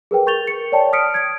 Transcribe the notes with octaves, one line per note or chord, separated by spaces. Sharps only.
G#4 A#4 B4 G5
A#4 C#6 G6 A6 F7 G7
C#7
C#5 D5 G5 A5
D#6 F6 B6 C#7 D7
G#6 D7